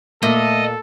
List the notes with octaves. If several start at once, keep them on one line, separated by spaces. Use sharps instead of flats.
A#2 A3 A4 D#5